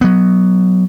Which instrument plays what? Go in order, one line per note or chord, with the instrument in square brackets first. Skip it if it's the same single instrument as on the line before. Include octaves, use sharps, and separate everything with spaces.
[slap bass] F#3 B3